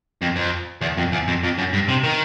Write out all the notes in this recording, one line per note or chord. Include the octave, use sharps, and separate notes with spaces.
F2
F2
E2
F2
E2
F2
F2
F#2
G2
C3
D#3